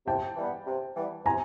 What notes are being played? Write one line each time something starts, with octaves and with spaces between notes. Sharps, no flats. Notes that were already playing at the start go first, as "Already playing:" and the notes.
C3 G5 A5
E3 G3 B3
C3
E3 G3 B3
C3 G#5 A#5